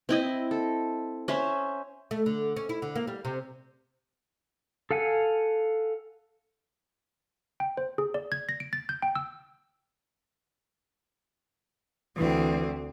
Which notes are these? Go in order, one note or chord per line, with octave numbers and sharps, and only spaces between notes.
C4 E4 D#5
A4
C#4 C5 E5
A3
D3
C#4
E4
D3
A#3
G3
C3
A4 F5 F#5 G#5
G5
C5
G#4
D5
G#6
A#6
D7
A6
G6
G5
E6
D2 E3 C4